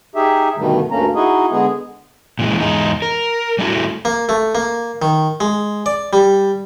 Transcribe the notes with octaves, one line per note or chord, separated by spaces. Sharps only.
D#4 G4 G#4 E5
G2 B2 D3 D#3 G3 A3
D2 G2 A3 A#3 C#4 A#5
D#4 E4 F#4 G#4 D#5
D3 G#3 B3 G#4
A#2 E3 G#3
E2 G#3 D#4
A#4
G3 A3 D#4 E4 F#4
A#3
A3
A#3
D#3
G#3
D5
G3